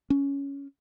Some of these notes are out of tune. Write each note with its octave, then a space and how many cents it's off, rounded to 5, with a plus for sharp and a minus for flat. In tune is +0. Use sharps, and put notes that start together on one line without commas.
C#4 +10